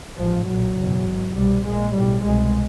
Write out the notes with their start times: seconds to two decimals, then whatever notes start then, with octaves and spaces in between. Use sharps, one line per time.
0.17 A1 G#2 F3
0.47 B1 A#2 F#3
0.77 F#1 E2 B2
1.07 G#1 G#2
1.35 C2 B2 G3
1.64 A#1 A#2 G#3
1.93 B1 A2 G3
2.24 C2 B2 G#3